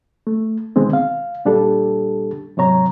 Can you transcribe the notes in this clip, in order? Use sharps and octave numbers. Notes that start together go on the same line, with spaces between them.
A3
B2 D3 D#3 G#3 B3 C4
F5
A#2 G3 D4 G4 A4
G#2 C3 F#3 C#5 A#5